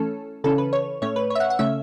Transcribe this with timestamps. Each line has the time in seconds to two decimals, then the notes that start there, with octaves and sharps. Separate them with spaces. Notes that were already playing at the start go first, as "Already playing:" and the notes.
Already playing: E3 A3 C#4 A4
0.44 C#3 E3 C#4 A4
0.58 B4
0.73 C#5
1.02 A2 A3 C#4 C#5
1.16 B4
1.30 C#5
1.35 E5
1.40 F#5
1.50 F#5
1.59 C#3 A3 C#4 E5